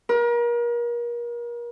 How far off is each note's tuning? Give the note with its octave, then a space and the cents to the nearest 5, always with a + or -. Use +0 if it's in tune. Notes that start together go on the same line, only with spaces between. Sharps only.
A#4 +35